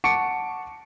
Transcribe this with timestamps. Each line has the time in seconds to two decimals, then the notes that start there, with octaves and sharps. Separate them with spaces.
0.04 F#5 A5 C#6 D6 C#7 D7